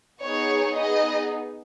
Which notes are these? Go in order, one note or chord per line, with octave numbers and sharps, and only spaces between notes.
B3 D#4 G#4 C#5
B3 D#4 G#4 D#5